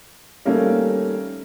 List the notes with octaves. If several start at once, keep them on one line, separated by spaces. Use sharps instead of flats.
D#3 G3 A3 A#3 C#4